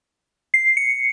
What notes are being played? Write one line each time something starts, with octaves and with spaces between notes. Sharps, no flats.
C7
C#7